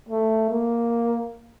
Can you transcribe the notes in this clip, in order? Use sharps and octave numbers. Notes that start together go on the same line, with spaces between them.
A3
A#3